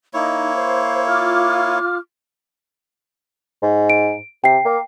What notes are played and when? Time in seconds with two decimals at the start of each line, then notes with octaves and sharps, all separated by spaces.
0.14 A#3 D#4 E4 C#5
0.55 C5
1.08 F4 D6 F6
3.62 G#2
3.90 D7
4.44 C3 G5 C7
4.65 A#3